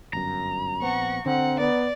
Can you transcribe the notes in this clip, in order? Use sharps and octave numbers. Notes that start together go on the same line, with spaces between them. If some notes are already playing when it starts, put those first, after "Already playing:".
G1 F#2 A#5
A#1 B3 C4 F#5 C#6
D3 C4 F#5
B3 D5